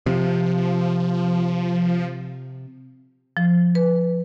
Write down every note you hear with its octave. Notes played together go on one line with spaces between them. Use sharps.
C3 F3
F3
B4